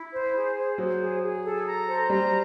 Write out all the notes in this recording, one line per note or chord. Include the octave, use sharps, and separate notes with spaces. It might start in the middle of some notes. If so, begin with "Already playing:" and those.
Already playing: E4
C5
G#4
C5
F#3 C5
G#4
G#4
A4
A#5
C5
G3 A#5